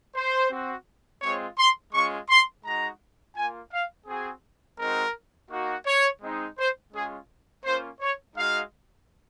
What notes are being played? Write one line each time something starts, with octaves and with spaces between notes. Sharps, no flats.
C5
C4 F#4
G#3 C4 F4 C#5
C6
G#3 C#4 F4 C#6
C6
G#3 D#4 F#4 A#5
A#3 F4 G#5
F5
C4 F#4 G#4
G#3 C4 D#4 F#4 A#4
A#3 D#4 F#4
C#5
G#3 C4 D#4
C5
G#3 C#4 F4 G#4
A#3 C#4 F4 C5
C#5
G#3 D#4 F#4 F5